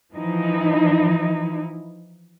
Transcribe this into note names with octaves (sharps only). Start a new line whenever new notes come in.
E3 F3 D#4 E4